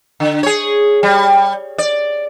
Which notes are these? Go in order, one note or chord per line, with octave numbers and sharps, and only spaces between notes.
D3
G#4 C#5
G3
D5